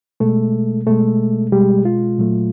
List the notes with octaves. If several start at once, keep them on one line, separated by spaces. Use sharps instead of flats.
B2 G#3 A3 A4
B2 G#3 A3 A4
B2 G3 G#3 G4
F4
A#2 F#3 A3